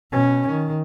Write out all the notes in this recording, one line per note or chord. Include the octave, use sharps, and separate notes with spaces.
B2 C#4
D#3